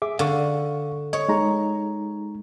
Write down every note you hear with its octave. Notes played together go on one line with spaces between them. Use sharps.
G#4 E5 D6
D3 F5 C#6
C#5 D#5
G#3 D#4 A#5